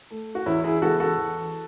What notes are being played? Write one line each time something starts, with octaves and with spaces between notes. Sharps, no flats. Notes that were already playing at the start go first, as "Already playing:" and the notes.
A3
F#4
E2 C#4 E4
E4 G#4
C#3 E3 G#3 B3 F#4 A4
F#4 A4
E2